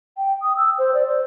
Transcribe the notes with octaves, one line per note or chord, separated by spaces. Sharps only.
G5
D#6
E6
C5
D5
C5